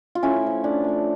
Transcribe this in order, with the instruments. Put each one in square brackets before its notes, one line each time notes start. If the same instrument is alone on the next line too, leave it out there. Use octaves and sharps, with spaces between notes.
[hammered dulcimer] F4
A2 C#4 E4
F3 A3
A2 D4
F3 A3